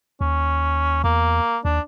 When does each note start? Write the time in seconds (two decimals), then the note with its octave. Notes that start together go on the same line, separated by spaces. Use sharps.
0.21 D#2 C#4
1.04 E2 A#3
1.65 D#2 D4